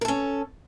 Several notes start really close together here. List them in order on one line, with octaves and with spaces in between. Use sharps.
A#4 A4 C#4